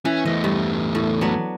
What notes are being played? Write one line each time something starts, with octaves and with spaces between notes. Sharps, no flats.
E3 C#4
E2 A3 D#5
G2
A2
F#3 B3 D4